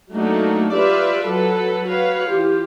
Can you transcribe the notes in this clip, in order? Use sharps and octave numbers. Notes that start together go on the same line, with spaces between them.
F#3 A3 A#3 D4 D#4 F#4
F4 G4 B4 D5 E5
F#3 A4 B4
F#4 B4 C#5 F5
E3 F4 G4